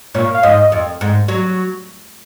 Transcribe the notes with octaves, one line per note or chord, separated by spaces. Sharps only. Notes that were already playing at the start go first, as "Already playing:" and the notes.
A#2 C#5
F5
G#2 D#5
F2
G#2
F#3